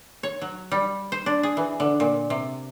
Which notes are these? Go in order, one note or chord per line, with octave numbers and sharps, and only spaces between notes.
C#5
F#3
G3
C5
D4
G#4
E3
D3
A#2
C3